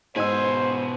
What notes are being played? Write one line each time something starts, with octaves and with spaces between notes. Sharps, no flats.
G#2 B2 C5 D#5 G#5 E6